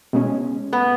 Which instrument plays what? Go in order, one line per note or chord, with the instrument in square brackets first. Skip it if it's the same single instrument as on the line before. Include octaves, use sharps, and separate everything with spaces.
[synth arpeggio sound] B2 G#3 C#4
[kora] B3